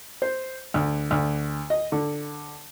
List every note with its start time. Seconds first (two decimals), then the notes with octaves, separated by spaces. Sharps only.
0.22 C5
0.74 D2
1.11 D2
1.70 D#5
1.92 D3